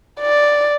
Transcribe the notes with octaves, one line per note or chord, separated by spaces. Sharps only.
D5